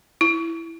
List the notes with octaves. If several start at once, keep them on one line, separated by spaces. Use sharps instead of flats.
E4